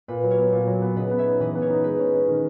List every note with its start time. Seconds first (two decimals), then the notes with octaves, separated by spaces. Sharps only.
0.08 A#2 B4
0.23 F#3
0.30 A#4 C#5
0.38 B3
0.52 A#2
0.67 F#3
0.82 B3
0.96 C#3 B4 D#5
1.11 B3
1.18 C#5 E5
1.26 D#4
1.40 E3 B4 D#5
1.55 B3
1.62 A#4 C#5
1.70 D#4
1.84 G#3 B4
1.99 C#4
2.13 C#4
2.28 D#3